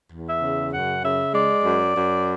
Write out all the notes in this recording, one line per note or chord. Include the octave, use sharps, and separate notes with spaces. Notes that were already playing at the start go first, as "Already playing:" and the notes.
E2
E5
C#3
F#2 F#5
C#3 E5
G#3 D5
F#2
F#2